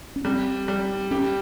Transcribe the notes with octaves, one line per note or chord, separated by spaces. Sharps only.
C#4
G3 C4
G3
C#4 G4